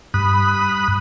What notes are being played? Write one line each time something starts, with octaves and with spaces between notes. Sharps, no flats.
G2 B5 D#6 F#6